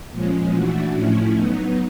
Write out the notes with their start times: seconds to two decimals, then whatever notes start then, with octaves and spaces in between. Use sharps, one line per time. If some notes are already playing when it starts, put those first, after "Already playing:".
0.11 A#2 F3 G#3 C#4
0.53 E3 A3 D4 F#4
0.93 A2 F3 A3 C#4 E4
1.34 F#3 B3 D#4